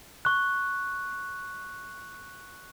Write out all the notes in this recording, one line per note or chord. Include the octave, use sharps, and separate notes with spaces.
C#6 F#6